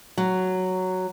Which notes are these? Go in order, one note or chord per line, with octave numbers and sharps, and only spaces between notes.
F#3